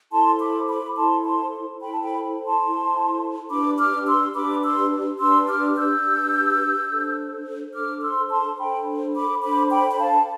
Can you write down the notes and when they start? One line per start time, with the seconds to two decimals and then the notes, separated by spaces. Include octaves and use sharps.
0.12 E4 A4 C5 A5 C6
0.40 B5 D6
0.68 B5 D6
0.96 E4 A4 C5 A5 C6
1.24 A5 C6
1.81 E4 A4 C5 G5 B5
1.92 A5
2.02 G5 B5
2.44 A5 C6
2.66 E4 A4 C5
3.50 D4 G4 B4 B5 D6
3.79 D6 F6
4.07 C6 E6
4.35 D4 G4 B4 B5 D6
4.63 C6 E6
5.19 D4 G4 B4 C6 E6
5.48 D6 F6
5.76 E6 G6
6.05 D4 G4 B4
6.89 D4 A4 C5
7.74 D4 A4 C5 D6 F6
8.02 C6 E6
8.30 A5 C6
8.58 D4 A4 C5 G5 B5
9.15 B5 D6
9.43 D4 A4 C5 B5 D6
9.71 G5 B5
9.90 B5
10.00 F5 A5